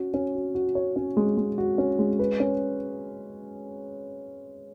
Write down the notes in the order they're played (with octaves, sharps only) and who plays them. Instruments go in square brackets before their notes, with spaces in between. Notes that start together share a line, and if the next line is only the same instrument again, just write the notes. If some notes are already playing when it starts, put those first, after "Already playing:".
Already playing: [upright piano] C#4 F#4
C#4
F#4
F#4
C#5
C#4
G#3
G#3
F#4
C#4
G#3
B4
C#4